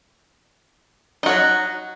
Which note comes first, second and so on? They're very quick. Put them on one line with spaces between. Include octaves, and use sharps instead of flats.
D#4 F#4 F#3